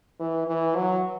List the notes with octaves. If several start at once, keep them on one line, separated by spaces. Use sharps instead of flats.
E3
E3
F#3